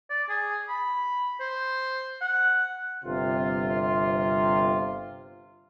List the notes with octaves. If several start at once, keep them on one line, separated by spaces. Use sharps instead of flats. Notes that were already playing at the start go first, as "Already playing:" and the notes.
D5
G#4
B5
C5
F#5
G1 C3 F4